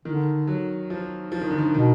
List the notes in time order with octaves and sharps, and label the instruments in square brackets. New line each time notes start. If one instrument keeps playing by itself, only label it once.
[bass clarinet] D3 [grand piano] D#3
[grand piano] F#3
F3
F3
D#3
D3
D#3
[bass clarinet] B2 [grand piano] D#3